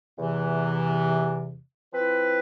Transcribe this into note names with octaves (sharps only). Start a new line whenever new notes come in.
E2 C3 E3
F3 C4 E4 B4